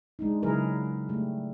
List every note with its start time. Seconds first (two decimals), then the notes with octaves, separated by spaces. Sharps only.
0.19 G#3 D4 D#4
0.43 C#3 F#3 E4 G#4 A#4 B4
1.09 G3 A3